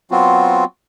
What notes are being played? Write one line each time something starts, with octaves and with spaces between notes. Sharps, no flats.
F#3 B3 C4 F4 F#4